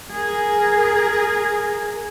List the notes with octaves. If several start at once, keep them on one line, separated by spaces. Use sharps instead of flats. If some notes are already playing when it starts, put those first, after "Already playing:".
G#4 A#4